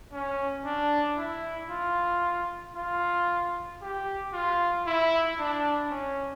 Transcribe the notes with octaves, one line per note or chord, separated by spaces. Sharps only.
C#4
D4
E4
F4
F4
G4
F4
E4
D4
C#4